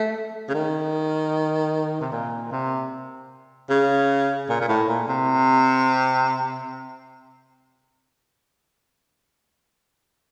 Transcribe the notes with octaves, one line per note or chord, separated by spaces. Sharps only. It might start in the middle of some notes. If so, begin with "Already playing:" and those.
Already playing: A3
C#3
D#3
C3
A#2
C3
C#3
A#2
A#2
A2
A#2
C3